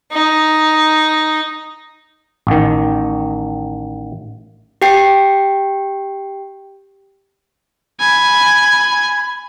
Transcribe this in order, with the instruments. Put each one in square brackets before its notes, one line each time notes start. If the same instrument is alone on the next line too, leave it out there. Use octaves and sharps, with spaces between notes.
[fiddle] D#4
[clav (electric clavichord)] A1 D#3
[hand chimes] G4 G5 C7
[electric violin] G#5 [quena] B5